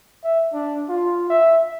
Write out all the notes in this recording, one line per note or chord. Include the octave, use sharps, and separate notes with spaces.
E5
D4
F4
E5